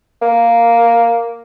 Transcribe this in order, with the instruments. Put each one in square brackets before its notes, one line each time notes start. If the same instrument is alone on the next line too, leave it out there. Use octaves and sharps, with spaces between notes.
[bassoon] A#3